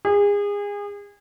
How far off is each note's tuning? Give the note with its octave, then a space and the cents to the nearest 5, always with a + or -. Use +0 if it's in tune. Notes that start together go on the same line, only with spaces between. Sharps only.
G#4 -30